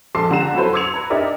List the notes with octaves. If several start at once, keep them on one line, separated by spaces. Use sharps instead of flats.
A#1 A4 A5 C6 D6 C7
C#2 D3 G4 A#5 E7
F#3 E4 F#4 A4 B4 C5
C6 D6 E6 G#6 C#7 F7
B4 A#5
D4 D#4 G4 A#4 D5 E5